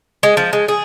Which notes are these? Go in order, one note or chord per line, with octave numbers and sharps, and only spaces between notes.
G#3
F3
G#3
G#4